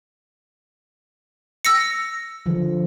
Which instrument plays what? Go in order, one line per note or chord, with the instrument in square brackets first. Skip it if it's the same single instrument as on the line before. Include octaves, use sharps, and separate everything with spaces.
[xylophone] E6 A#6 C#7
[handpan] D3 F3